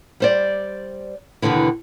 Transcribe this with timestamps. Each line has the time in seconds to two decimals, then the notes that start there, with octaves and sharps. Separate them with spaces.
0.20 G3 C5 D5
1.42 D#2 G#2 B2 D3 E3